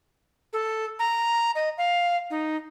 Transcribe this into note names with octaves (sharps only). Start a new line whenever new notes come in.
A4
A#5
D#5
F5
D#4